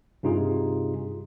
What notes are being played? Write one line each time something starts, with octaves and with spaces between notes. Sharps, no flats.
G2 C3 D#4 F4 G#4